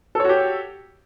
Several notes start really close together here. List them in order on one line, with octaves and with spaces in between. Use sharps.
A4 C#5 F#4 G4